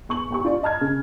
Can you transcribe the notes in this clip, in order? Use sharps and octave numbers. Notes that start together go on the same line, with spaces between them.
E2 C#6 F#7
E2 G4 C#6
F4 D5
D#5 A5 F6 G#6
C#3